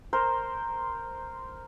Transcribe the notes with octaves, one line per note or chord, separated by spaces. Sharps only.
A#4 C5